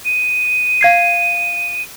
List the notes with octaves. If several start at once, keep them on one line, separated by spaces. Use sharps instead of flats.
D#7
F5 G#6 C7